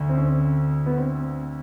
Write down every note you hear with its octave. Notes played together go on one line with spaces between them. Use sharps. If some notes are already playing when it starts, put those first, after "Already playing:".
Already playing: D2 D3
C4
C#4
C4
B3
C4